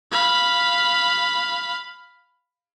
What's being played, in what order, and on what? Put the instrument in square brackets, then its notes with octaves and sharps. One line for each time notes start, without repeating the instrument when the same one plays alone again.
[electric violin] F5 B5